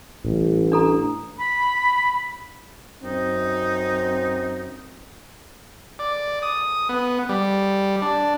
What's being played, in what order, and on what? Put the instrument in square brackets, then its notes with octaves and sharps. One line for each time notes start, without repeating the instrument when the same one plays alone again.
[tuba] A1 [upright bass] A2 G3
[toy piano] D4 A4 A#5
[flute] B5
[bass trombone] F#2 [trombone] C4 [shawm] D#4
[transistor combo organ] D5
D#6
B3
G3
D4